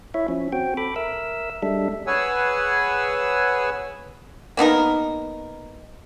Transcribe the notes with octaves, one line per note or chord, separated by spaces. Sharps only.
E4 C#5 E5
F3 C#4
C4 F#4 G5
A4 B5 D6
A#4 E5 E6
G3 G#3 D4 A4 E5
G#4 B4 C#5 F#5 G#5 E6
A#3 B3 D#4 A#4